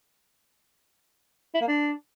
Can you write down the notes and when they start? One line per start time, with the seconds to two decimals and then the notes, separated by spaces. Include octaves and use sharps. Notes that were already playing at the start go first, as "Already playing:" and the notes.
1.54 E4
1.61 A#3
1.68 D4